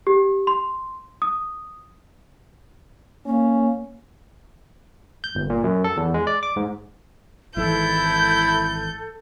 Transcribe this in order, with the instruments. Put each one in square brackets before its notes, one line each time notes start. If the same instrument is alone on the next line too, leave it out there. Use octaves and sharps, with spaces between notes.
[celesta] G4
C6
D#6
[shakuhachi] A#3 [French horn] C#4
[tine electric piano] G6
G1
A#2
F#2
A4
E2
G#3
D5
D6
G#2
[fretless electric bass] G#1 E3 [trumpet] E4 [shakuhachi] A4 [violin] G6